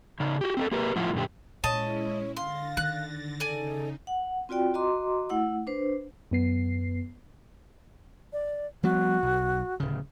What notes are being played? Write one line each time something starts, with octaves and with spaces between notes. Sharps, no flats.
C#3 D#4
F#4 G4
C4 G4 A4
A#3 G4 A#4 B4
A2 F3 E4 F4 F#5
F#2 A#2 D3 G4
A#2 G#3 C#4 E4 C#5 D#5 A5
D3 F5 C6 A6 A#6
D#3 F#6
C#3 D#4 A4 D5 G#5
F#5
C4 F4 F#4 D5 G5
F#4 D#5 A#5 C6 D6
A3 E4 F#5 E6
D4 B4 C5
F#2 B3 C7
D5
F3 G3 B3 F#4
B1
D1 C#3